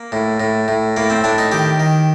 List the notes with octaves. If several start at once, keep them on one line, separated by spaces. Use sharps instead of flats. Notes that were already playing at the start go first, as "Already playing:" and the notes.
Already playing: A#3
A2
A2
A2
A2 A#3
C4
A2 D4
D#4
D#3 G4
D#3